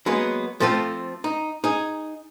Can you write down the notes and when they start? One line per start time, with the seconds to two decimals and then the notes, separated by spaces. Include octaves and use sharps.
0.06 F#3 G#3 A#3 B3
0.60 F3 A3 C4 F4 A4
1.24 D#4
1.64 D#4 G#4